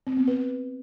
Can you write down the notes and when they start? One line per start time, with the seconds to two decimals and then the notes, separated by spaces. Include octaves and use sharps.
0.07 C4
0.17 B3
0.28 B4